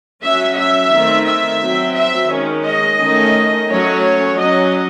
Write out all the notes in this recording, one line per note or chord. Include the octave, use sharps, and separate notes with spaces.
F#3 C#4 E5
E5
D#3 A3 C4
E5
F#3 C4
E5
D#3 G#3 C#4
D#5
D#3 A3 C#4
F#3 A3 C#4 C#5
F#3 C#4 D#5